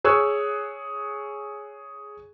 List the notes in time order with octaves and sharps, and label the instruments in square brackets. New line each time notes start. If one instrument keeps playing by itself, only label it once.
[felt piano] G#4 C#5 C#6 E6 F#6 G#6